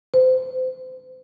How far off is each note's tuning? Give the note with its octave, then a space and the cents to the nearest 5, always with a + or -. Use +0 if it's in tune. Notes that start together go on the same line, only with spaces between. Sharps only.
C5 -30